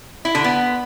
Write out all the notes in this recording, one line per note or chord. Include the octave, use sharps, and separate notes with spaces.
E4
D3
B3